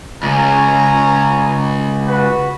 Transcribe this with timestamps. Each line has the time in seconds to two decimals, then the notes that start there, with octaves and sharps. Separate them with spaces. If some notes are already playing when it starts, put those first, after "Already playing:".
0.23 C#2 C#4 G#5 A#5
2.07 F#4 B4